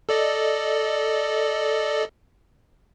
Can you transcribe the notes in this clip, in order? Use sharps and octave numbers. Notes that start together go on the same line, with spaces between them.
A4 D5 D#5